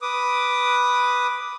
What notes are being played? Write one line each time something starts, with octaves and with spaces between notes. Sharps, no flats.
B4 D6 D#6